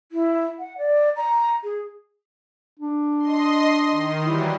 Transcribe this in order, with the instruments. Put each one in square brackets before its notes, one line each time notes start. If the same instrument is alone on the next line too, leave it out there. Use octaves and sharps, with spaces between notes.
[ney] E4
F#5
D5
A#5
G#4
[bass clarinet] D4
[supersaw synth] D#5 C6
D#3
[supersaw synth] E3 F#3 G3 [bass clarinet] E4